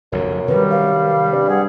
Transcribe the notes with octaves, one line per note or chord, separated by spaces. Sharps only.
F1 B1 F#2 C#3
C3 D#3 F#3 G3 B4
F5
G2
G#4 F#5